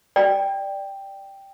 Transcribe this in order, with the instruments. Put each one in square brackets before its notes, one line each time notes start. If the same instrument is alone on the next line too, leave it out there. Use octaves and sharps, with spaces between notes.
[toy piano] D5 [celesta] G5